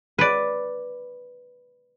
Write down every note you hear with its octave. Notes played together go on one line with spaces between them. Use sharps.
B4 D5